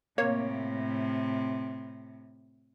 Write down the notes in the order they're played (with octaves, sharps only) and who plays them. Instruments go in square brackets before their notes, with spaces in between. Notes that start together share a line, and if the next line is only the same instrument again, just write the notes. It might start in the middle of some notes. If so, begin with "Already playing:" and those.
[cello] A2 C3 [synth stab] A#3 C#5